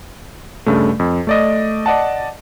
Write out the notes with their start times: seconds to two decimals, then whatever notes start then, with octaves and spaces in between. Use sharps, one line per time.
0.66 G2 C#3 A3
0.99 F2
1.27 A3 D5 D#5
1.86 D5 D#5 F#5 A5